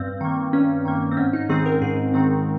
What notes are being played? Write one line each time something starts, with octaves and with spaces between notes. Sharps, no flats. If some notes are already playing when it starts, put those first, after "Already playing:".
Already playing: G2 C4
D#3 A#3
G2 C#4
D#3 A#3
C4
G#2 C#4
D#4
D#3 G#3 C4 G#4
A#4
G#2 G#4
D#3 G#3 C4